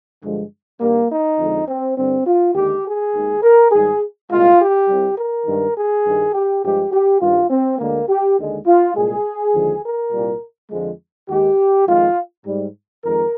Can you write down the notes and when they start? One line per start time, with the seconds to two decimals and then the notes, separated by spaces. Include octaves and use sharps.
0.23 G2 D3 F3 G#3
0.80 G2 D#3 G3 A#3
1.10 D#4
1.38 F2 D3 G#3
1.68 C4
1.96 G2 D3 G3 C4
2.26 F4
2.55 D#2 D3 G#3 G4
2.84 G#4
3.14 D#2 D#3 G#3
3.42 A#4
3.71 G#2 D#3 G3 G#4
4.30 C2 A#2 G#3 F4
4.59 G4
4.87 C2 C3 G3
5.16 A#4
5.46 G2 D#3 G#3
5.75 G#4
6.04 G2 D#3 G3
6.33 G4
6.62 G2 F3 G#3 G4
6.92 G4
7.20 G2 D#3 G3 F4
7.49 C4
7.78 D2 D3 G#3 A#3
8.08 G4
8.37 D#2 D3 G#3
8.66 F4
8.95 C2 A#2 G#3 G#4
9.54 D#2 D3 F3 G#3
9.83 A#4
10.12 C2 A#2 G3
10.70 F2 D3 F3 G#3
11.28 D#2 D#3 G#3 G4
11.86 F2 D#3 G#3 F4
12.45 G#2 G3
13.03 F2 D#3 G#3 A#4